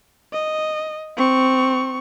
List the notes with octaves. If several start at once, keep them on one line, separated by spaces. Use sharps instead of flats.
D#5
C4 C#6